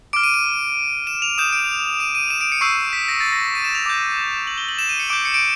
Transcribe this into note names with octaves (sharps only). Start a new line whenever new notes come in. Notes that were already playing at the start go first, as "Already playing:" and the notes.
D6 F6 D7
D#7
D#7
E7
F7
D#6 G6 E7
D7
D#7
D#7
E7
D7
C#7
C#6 E6 G6 C7
B6
A#6
A6
A#6
D#7
E7
F7
D6 G6
F#7
G7
F#7
E7
D#7
C#7
D6 G6 D7
C#7
D7